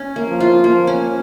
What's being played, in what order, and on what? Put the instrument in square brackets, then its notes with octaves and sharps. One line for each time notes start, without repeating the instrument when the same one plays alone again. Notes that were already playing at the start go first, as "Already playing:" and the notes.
Already playing: [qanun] C#4
A#3
[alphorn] F3
[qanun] F4
[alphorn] F3 [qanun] A#3
[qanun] C#4